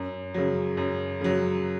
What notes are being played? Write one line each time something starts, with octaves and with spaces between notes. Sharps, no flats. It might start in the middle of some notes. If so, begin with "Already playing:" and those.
Already playing: F#2
C#3 F#3
F#2
C#3 F#3